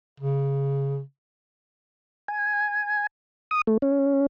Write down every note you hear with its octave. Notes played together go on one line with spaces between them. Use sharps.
C#3
G#5
D#6
A3
C#4